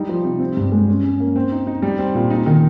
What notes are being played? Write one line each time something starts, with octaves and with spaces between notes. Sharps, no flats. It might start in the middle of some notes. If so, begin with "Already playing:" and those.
Already playing: G3 D#4
F3
C3
C4
G2
G#3
C#4
C#4
A#3
C4
D#4
D#4
G3
C4
A#2
D#4
D#3